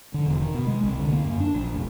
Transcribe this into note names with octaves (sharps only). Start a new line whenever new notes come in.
D3
E1
D#3
B2
G#3
C2
D3
A#3
F#2
D4
A#1
F1